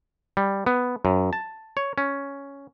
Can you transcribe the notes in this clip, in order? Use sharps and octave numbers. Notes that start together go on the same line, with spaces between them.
G3
B3
F#2
A5
C#5
C#4